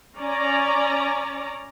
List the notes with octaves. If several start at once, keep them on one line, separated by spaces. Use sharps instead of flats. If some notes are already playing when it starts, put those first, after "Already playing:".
C#4 D5 A#5